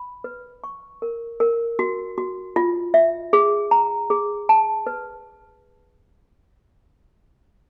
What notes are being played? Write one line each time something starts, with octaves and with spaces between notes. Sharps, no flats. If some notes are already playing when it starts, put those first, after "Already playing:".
Already playing: B5
B4
C#6
A#4
A#4
F#4
F#4
F4
E5
G#4
A#5
G#4
A5
B4